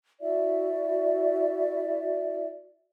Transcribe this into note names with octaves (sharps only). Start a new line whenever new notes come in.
E4 F#4 D5 E5